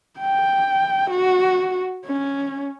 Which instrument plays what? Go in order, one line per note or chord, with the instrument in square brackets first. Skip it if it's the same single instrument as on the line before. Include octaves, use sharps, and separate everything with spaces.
[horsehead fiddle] G5
F#4
C#4